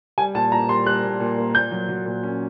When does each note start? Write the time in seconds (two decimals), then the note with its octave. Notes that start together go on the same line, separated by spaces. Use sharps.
0.18 G3 G#5
0.35 A#2 A5
0.52 A#2 A#5
0.69 G3 C6
0.86 G3 F#6
1.04 A#2
1.20 A#2
1.38 A#3
1.55 A#2 G6
1.71 F#3
1.89 F#3
2.06 A#2
2.23 C#4